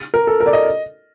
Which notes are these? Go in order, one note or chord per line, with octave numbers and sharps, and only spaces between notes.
A#4
A4
A#4
D5
D#5